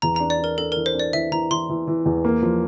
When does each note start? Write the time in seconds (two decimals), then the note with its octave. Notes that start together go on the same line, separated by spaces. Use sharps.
0.02 E2 A#5
0.16 D4 A#5
0.30 D5
0.39 D4 A#4
0.58 D4 A4
0.72 E3 A#4
0.86 C5
0.95 D4 D5
1.13 E3 E5
1.31 E3 A#5
1.51 E3 C6
1.69 E3
1.87 E3
2.06 E2
2.25 A#3
2.43 F3